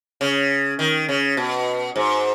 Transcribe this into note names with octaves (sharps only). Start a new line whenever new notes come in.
C#3
D#3
C#3
B2
G#2